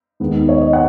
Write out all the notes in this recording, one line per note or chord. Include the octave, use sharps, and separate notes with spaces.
D#2 D#3 G#3 B3
C#5
D#5
F#5